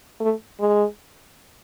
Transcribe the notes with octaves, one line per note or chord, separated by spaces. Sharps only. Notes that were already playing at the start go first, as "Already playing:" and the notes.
A3
G#3